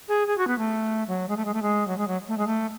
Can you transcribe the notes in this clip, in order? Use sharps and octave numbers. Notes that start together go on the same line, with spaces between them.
G#4
G#4
F#4
B3
A3
F#3
G#3
A3
G#3
A3
G#3
F#3
G#3
F#3
A3
G#3
A3